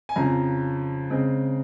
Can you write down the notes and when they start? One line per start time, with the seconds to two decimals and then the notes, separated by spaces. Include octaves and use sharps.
0.09 G#5
0.16 F2 C#3 F3 A#5
1.10 C#3 G#3 C4